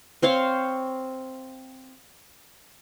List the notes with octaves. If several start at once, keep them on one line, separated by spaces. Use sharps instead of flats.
C4 C5 C#5 F5